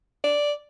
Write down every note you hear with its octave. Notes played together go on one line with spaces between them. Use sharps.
D5